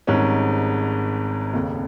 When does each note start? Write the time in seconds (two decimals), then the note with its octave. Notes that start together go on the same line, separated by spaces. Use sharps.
0.07 G#1 G#2 G3 C#4
1.53 F1 D#2 C#3